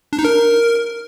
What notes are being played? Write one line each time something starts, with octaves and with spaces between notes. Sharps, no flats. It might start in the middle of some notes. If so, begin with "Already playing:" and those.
D4
D#4
A#4